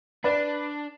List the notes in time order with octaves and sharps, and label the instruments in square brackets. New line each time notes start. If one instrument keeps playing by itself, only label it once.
[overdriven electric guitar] D4 [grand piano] B4 D5